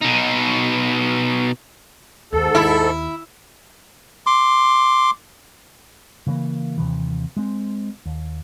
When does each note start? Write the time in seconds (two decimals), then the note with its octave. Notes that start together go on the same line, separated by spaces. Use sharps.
0.01 B2 D#4
2.33 D#2 G#2 A4
2.55 D#2 E4
4.27 C6 D6
6.27 C#3 E3 A3 A#3
6.78 D#2 C3 E3
7.37 G#3 C4
8.06 D#2